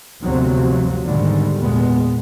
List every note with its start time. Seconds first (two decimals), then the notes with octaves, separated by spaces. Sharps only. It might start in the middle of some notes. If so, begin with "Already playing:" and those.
0.23 G1 D2 C3 F3 F#3 C4
1.05 G#2 B2 D3 D#3 G3 G#3
1.59 E2 A#2 G#3 B3